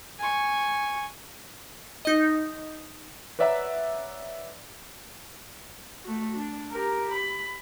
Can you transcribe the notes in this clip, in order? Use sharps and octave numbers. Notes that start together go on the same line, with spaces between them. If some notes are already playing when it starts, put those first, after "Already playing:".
G#5 C#6
D#4 D#5
B4 C#5 D5 E5 F#5 A#5
A3 F#4
D4
G4 A#4
B5